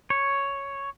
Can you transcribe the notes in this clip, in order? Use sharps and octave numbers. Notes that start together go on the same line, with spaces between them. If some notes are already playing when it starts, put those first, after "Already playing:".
C#5